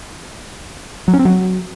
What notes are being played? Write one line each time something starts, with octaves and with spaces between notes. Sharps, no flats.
F#3
C#4
C4
F#3